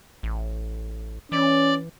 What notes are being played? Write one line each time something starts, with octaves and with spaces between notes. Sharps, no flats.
A1
E3 C#4 D5